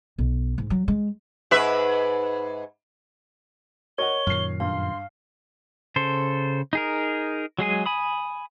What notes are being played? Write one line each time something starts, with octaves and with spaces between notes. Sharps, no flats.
B1
G#2
F#3
G#3
G#2 B4 E5
A#4 C#5 D#5 F#5 C#6 G7
F#2 A#2 D#3 F6 C7
G2 F5 C6
C#3 A4 C5
D#4 G#4 A#4
F#3 G#3 G#4 G#5
G#5 B5 D#6